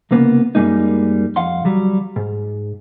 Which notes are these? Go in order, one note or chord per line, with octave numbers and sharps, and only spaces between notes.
C2 C#3 A#3 B3
F#2 G3 G#3 A#3 D#4
F2 F5 F#5 C6
D2 F#3 G3
G#2